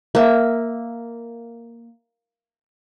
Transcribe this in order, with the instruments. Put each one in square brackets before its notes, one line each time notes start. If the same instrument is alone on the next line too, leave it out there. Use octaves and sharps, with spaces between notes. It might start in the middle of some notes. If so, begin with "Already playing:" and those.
[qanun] A#3 E5